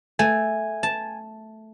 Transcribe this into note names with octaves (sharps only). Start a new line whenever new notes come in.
A3 G#5
A5